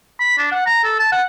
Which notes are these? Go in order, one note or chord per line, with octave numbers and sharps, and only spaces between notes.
B5
D4
F#5
A#5
A4
A5
F#5